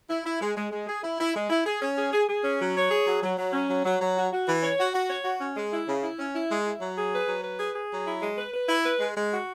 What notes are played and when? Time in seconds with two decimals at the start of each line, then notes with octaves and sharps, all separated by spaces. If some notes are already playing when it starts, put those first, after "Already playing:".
0.09 E4
0.24 E4
0.41 G#3
0.56 G#3
0.72 G#3
0.88 G#4
1.03 E4
1.19 E4
1.35 G#3
1.50 E4
1.66 G#4
1.81 C#4
1.97 G#4
2.12 G#4
2.27 G#4
2.43 C#4
2.59 F#3
2.75 C#5
2.90 G#4
3.06 F#3
3.22 F#3
3.37 F#3
3.52 C#4
3.68 F#3
3.85 F#3
4.00 F#3
4.16 F#4
4.32 F#4
4.47 E3
4.63 C#5
4.78 F#4
4.93 F#4
5.09 C#5
5.24 F#4
5.40 C#4
5.57 G#3
5.72 E4
5.87 C#3
6.03 E4
6.18 C#4
6.34 E4
6.50 G#3
6.65 E4
6.80 F#3
6.96 G#4
7.13 B4
7.28 F#3
7.43 B4
7.59 G#4
7.74 G#4
7.91 F#3
8.05 E4
8.21 G#3
8.37 B4
8.53 B4
8.68 E4
8.85 B4
8.99 G#3
9.15 G#3
9.31 F#4